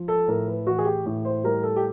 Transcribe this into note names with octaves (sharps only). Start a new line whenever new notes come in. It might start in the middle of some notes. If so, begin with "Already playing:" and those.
Already playing: F3
A4
A2 A#4
B4
E3 F#4
G#4
G4
A2
C5
G3 A#4
A4
G4